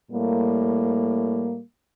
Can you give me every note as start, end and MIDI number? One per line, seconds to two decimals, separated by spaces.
0.12 1.60 45
0.12 1.60 55
0.12 1.60 58